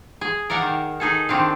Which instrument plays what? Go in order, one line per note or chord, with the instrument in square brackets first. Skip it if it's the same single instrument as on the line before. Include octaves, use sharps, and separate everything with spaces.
[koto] G#4
A#4 D5 F5 F#5
D#3
D#4 G#4 A4
D#3 C4 D4 F5